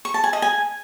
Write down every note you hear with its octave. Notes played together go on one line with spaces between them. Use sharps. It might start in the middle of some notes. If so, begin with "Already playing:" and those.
C#6
A5
G#5
D#5
G#5